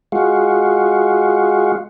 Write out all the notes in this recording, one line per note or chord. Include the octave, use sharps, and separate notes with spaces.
G#3 F4 F#4